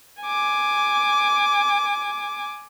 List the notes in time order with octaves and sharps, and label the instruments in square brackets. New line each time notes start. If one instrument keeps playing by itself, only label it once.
[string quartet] G#5 D6